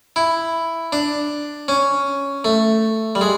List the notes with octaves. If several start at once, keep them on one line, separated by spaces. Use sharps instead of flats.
E4
D4
C#4
A3
G3
G#3